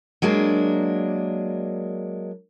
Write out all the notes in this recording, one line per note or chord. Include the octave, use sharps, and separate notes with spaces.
F#3 G#3 A#3 D4